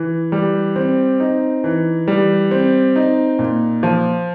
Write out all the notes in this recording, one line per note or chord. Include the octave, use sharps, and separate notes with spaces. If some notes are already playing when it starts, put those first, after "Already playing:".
Already playing: E3
G3
C4
D#4
E3
G3
C4
D#4
A#2
F3